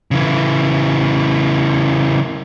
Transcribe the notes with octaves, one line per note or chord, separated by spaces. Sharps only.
C#3 E3